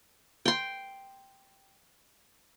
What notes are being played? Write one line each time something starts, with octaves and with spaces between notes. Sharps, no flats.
G5 C6